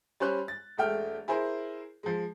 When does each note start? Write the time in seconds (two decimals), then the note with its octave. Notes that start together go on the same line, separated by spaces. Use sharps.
0.20 G3 C#4 C5 C#5 C6 F#6
0.48 A6
0.77 E1 G#3 A3 E5 G5 F6
1.28 E4 G#4 A#4 C5
2.03 F3 G#3